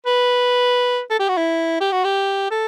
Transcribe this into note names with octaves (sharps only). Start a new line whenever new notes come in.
B4
A4
G4
F#4
E4
G4
F#4
G4
A4